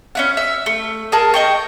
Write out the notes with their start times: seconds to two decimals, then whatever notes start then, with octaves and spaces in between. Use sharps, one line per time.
0.15 C#4 E4 F#5
0.37 E5
0.66 A3
1.12 G#4 A#4 A5
1.34 D#5 G5 C#6